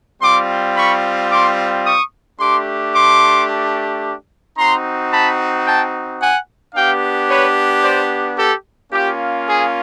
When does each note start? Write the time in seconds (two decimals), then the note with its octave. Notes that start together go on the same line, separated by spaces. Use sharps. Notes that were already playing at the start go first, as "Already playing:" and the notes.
0.22 G3 C4 F4 C6 D6
0.77 B5 C#6
1.31 C6 D6
1.86 C#6 D#6
2.39 A3 D4 G4 C6 D6
2.94 C6 D6
4.57 C4 D#4 F#4 A#5 C6
5.12 A5 B5
5.66 G5 A5
6.21 F#5 G#5
6.74 B3 D4 G4 F5 G5
7.29 B4 C#5
7.83 C5 D5
8.37 G4 A4
8.92 A#3 C#4 F4 G4
9.47 G#4